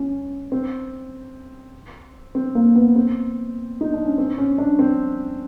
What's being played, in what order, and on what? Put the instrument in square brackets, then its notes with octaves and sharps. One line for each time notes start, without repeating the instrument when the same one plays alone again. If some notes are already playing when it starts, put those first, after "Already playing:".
Already playing: [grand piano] C#4
C4
C4
A#3
B3
C4
D#4
D4
C#4
C4
C#4
D4
C4